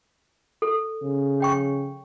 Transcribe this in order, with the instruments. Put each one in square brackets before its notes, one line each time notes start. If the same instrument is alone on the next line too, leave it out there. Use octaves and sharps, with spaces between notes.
[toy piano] A4
[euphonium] C#3
[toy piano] C#5 G5 C#6